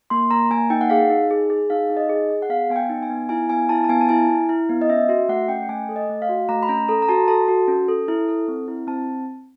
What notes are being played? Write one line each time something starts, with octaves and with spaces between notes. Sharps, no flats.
A#3 C6
A#3 A#5
A#3 G#5
D#4 G5
F#5
G#4 F5
D#4
G#4
G#4
D#4 F5
D#4
D#5
G#4
G#4
F#5
B3 F5
B3 G#5
G5
D#4
G#5
B3
E4 G#5
B3 G#5
E4 A5
A5
B3 G#5
A5
E4 G#5
E4
E4
B3
D#5
C#4 E5
F#4 E5
A3 F#5
C#4 G5
G5
A3 G#5
A4
D#5
A3
F5
F#4
A3 A#5
B5
C#4 A#5
A4 A#5
A#5
F#4 A5
A4 A5
F#4
C#4
A4
E4
A4
C4
E4
C4 A5